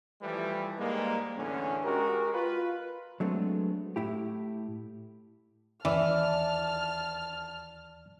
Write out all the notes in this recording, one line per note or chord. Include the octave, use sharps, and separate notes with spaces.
E3 F3 G3 A3 E4 B4
G#2 G3 G#3 A#3
E2 A2 D3 C#4
G#3 F#4 G4 A#4
F4 B4
F#3 G#3 A3 B3 C4 D4
A2 E4 G4
D#2 E3 D5 A5 F6